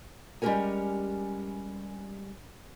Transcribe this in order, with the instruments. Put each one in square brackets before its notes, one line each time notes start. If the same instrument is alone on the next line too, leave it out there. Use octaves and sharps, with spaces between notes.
[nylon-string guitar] G3 G#3 C#4 G4 A#4 G#5